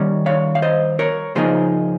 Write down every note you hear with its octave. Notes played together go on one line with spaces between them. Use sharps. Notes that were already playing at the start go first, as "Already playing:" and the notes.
Already playing: D#3 G3 C#4
C#5 F5
F5
C5 D#5
A#4 C#5
C#3 F3 A#3 D#4 G#4 C5